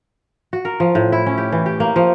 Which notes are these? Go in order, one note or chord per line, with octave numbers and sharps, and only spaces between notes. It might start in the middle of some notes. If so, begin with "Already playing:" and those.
F#4
A#4
F3
A2
E4
C#4
G4
E3
G4
A#3
F3